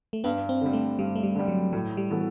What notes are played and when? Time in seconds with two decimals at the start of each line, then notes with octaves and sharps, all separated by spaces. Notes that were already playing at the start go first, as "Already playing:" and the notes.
0.13 A3
0.24 G2 B3
0.49 C4
0.61 D3 G3
0.73 A3
0.99 G2 G3
1.15 A3
1.23 G3
1.35 D3 G3
1.48 F#3
1.73 A2 F#3
1.97 G3
2.10 E3 B3 F#4 A4